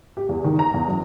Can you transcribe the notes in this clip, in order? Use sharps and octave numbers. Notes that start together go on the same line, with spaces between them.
G4
E2
D#3
A#5
E2
F#2